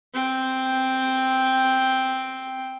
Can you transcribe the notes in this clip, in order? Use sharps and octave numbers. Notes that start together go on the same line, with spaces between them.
C4 G5